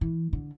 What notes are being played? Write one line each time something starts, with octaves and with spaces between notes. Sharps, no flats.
E3
D3